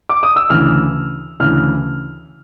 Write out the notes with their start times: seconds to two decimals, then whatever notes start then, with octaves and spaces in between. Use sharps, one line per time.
0.09 D6
0.23 D#6
0.36 E6
0.50 D2 C#3 E3 F6
1.40 D2 C#3 E3 F6